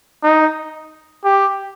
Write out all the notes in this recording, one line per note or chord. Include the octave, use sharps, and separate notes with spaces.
D#4
G4